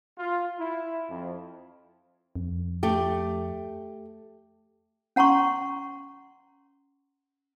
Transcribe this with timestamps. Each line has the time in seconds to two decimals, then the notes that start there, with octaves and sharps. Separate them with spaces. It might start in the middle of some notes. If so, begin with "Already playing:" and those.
0.17 F4
0.58 E4
1.08 F2
2.36 F2
2.83 A3 G4
5.16 C#4 F#5 A#5 C6 C#6